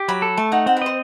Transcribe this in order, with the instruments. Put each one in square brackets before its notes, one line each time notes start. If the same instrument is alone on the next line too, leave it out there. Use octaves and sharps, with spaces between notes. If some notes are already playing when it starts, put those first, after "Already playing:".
Already playing: [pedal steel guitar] G4
[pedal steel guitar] F#3 [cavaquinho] B5
[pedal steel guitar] A4
[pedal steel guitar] A3 [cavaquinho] A5
[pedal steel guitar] D#4 [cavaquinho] F#5
[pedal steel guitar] C4 [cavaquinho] F#5
[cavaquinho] B4
[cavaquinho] C5 [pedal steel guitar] D#5